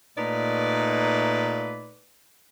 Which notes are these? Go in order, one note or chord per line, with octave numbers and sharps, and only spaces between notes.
A#2 A3 D#4 B4 D5